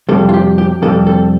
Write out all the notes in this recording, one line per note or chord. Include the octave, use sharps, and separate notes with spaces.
F2 C3 G3 A4
F4
G4
G4
F2 C3 G3 A4
A4